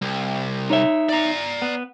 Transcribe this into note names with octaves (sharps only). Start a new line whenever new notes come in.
C2
D#4 C#5 E5
D5 A#5
B3